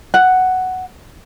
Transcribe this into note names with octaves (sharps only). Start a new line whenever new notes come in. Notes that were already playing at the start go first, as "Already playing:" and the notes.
F#5